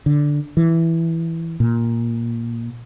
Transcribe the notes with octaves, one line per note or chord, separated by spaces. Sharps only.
D3
E3
A#2